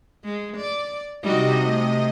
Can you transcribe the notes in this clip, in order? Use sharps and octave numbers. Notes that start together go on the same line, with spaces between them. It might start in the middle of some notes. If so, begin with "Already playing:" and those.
G#3
D5
C3 G3 D#4 F#4 D#5
A3